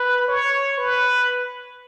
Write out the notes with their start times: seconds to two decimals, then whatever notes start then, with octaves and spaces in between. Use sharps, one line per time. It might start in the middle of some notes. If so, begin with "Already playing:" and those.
Already playing: B4
0.28 C#5
0.78 B4